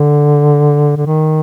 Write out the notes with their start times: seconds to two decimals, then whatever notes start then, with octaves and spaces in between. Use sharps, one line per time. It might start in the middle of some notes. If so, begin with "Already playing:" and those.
Already playing: D3
0.97 D3
1.06 D#3